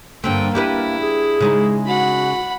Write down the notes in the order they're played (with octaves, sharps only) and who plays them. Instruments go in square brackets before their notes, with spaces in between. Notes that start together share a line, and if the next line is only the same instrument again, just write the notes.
[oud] G2 D3 C4 [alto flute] A#3 [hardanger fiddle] G5
[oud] D4 G4 B4 [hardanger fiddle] E4
[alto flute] G#4
[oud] C#3 G#3 D#4
[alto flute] F#4 [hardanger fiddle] F#5 B5